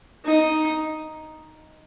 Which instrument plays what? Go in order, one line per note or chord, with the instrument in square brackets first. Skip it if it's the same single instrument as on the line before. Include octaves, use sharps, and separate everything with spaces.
[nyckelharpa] D#4